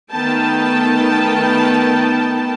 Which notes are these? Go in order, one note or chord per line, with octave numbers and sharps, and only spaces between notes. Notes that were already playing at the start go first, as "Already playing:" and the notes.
D#3 A3 B3 G5 A5